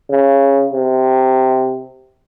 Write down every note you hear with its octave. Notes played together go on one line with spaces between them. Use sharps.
C#3
C3